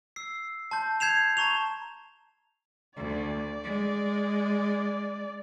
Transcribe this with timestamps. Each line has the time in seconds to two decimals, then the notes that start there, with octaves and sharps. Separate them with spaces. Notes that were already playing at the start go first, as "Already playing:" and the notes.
0.16 E6 C7
0.71 A5 C6 G6
1.00 G6 G#6 C7 E7 F7
1.37 A5 A#5 C#6 F7
2.97 D2 D5
3.64 G#3